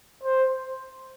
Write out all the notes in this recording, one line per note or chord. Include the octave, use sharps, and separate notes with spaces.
C5